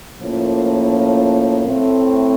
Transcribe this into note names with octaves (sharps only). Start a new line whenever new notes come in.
A2 F3 A#3 C#4 F4
A2 A3 C4